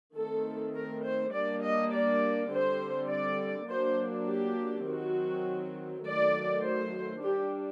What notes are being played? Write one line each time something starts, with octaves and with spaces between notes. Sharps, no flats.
D#3 A3 C4 A4
A#4
C5
G3 A#3 D4 D5
D#5
D5
D3 G3 C4 C5
D5
F#3 A#3 D4 C5
G4
D#3 F#3 C4 F#4
D#3 F#3 A3 D5
C5
G3 D4 G4